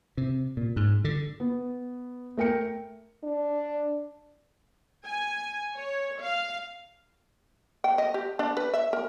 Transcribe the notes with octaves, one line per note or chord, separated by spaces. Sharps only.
C3
A#2
G#2
D3
B3
A3 A#4 G5 C#7
D4
G#5
C#5
F5
G5
D#5
G4
D4
B4
E5
A#4